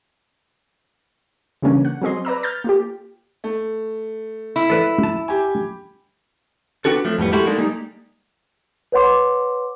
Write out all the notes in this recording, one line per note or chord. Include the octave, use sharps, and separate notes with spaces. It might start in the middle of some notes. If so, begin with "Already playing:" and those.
C#3 E3 G3 A#3 C#4 D4
F#5
F#3 G3 C4 G#4 D#5 C6
B4 D5 A#5 E6
F6 G6 A6
A#3 F4 G4
A3
E4
A4 B4 D5
A5
G4 G#5
B3 C4 D4 F#4 A4
F3 F#3 A3
F2 A2 G3 B3
G#3 A#3 E4 F#4 G4 A4
F#3 G#3 A#3 D4 D#4 A4
G3 G#3 A#3 D#4
B4 C#5 F#5 C6 D6